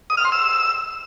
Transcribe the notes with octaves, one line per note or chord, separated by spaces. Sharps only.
D#6
F6
C6
E6